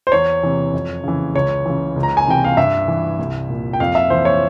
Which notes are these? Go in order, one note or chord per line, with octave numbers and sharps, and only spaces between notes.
C5
E2 C#5
C3 E3
F2
C#3 E3
C#2 C#5
C#3 E3
C#2
A#5
G#5
C3 E3 G5
F5
G2 E5
E3
C2
A#2
G5
F2 F5
E5
E3 C5
C#5